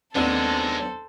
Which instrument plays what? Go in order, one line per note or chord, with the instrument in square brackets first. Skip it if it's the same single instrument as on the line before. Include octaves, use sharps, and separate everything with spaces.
[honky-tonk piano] D#2 C4 [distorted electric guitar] F#3 G#3 [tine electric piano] B3 D4 [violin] A4 C5